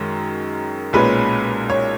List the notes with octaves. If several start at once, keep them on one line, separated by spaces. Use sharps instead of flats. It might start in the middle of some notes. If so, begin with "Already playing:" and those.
Already playing: F#2 D#3 G#3
B1 A#2 G#3 C#4 B4
C#5